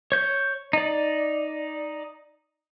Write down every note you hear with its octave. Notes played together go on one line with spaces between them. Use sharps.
C#5 G6
D#4 D5